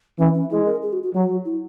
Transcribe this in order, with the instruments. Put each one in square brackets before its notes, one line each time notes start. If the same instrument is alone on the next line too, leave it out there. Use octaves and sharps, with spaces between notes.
[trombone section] E3 [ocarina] C#4
[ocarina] C#4
[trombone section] G#3 [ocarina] E4
[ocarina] A#4
G#4
F#4
F#4
[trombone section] F#3 [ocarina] F#4
[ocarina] E4